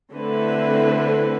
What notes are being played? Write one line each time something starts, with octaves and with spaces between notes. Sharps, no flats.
D3 A3 C4 E4 B4